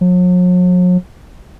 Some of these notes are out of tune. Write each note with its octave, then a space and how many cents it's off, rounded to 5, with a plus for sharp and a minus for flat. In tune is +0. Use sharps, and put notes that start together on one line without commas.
F#3 -45